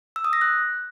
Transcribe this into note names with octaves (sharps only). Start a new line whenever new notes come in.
E6
D#6
A#6
F#6